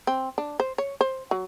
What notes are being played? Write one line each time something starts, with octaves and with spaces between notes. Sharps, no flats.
C4
D4
C5
C#5
C5
F#3